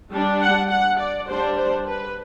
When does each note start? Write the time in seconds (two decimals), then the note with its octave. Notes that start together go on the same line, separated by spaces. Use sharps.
0.11 G3 D4
0.41 F#5
0.70 F#5
1.00 D5
1.28 G3 D4 C5
1.57 C5
1.87 B4